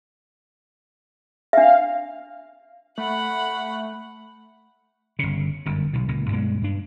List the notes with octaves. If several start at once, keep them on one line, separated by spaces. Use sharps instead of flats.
D4 E5 F5
A3 F#5 B5
G1 C#3
G1 F#2
B1 B2
C#2 A#2
G2 B2 G3 G#3
G2 D4